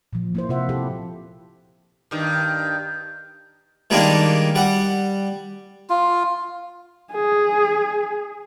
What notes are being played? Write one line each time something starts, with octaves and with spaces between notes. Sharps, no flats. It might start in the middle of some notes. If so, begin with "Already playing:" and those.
A#2 F3
A#3 E4 C5
C3 F3 F4 C5 E5 F#5
E4 G4 A4
G2 D#3
D#3 G3 G#3 A#3 D4 D#4
G3 F#5
F4
G#4